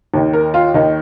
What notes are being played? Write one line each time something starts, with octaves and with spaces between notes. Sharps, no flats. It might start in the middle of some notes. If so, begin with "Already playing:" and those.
D#2 D#3
A#4
F4
D#2 D#3 D#4